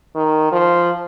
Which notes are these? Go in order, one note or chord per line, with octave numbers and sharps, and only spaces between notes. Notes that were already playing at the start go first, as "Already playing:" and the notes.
D#3
F3